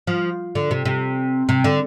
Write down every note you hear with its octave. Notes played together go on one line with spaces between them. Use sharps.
F3
D3
C3
C3
C3
D3